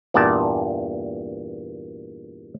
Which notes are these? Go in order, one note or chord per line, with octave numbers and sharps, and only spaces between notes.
E2 G2 A#2 D5 A5